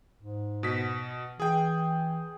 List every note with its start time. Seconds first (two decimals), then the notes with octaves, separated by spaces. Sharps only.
0.19 G#2
0.63 B2 B6
1.40 E3 G#4 G5